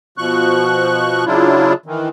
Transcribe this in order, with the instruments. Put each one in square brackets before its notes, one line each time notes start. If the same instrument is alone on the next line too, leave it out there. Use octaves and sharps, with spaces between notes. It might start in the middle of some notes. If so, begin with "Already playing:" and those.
[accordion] B2 F3 C#6 F#6
C#3 F#3 D4 E4 F4
D#3 E3